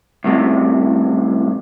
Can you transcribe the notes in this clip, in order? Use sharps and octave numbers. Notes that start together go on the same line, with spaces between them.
C2 F#2 A2 C3